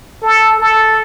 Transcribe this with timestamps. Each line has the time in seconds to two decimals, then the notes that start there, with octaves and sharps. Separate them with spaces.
0.22 A4
0.60 A4